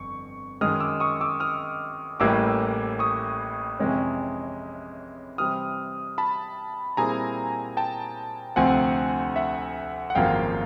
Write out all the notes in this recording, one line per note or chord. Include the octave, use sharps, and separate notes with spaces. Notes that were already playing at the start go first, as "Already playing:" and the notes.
Already playing: G1 F2 C#6
F#2 D#3 G#3 D#6 F6
D6 E6
C#6 D#6
D6 E6
D#6 F6
A1 A2 E3 G3 A#3 D6 E6
C#6 D#6
F2 C3 E3 G#3 C#4
C3 E3 G3 C4 D#6 F6
A5 B5
A#2 G3 C4 E4 G#4 G#5 A#5
G5 A5
D2 C3 F3 A3 C4 F#5 G#5
E5 F#5
F#5
G#1 F#2 C#3 F3 A#3 F5 G5